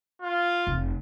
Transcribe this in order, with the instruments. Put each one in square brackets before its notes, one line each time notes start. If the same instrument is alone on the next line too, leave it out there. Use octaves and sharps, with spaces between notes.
[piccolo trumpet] F4
[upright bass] F1